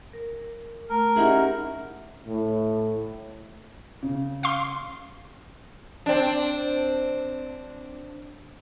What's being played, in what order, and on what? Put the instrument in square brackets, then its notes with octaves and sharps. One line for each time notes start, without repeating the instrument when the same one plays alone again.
[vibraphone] A#4
[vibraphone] A3 [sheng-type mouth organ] A#4
[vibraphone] C#4 G4 F#5 [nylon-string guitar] D#4 E4 G#4
[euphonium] A2
[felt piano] C#3
[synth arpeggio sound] F5 C6
[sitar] C4 D4